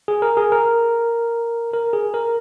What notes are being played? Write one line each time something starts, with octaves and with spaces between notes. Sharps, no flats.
G#4
A#4
G#4
A#4
A#4
G#4
A#4